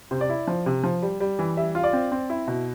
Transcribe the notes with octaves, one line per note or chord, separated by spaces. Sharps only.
C3 C5
D5
E4
F3
C3
F3
G3
G3
E3
G3 E5
F4
D5
C4
C4
E4
B2